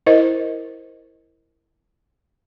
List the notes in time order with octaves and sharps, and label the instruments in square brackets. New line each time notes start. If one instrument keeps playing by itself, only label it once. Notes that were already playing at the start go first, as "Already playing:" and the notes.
[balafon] E4 A#4 C5 D#5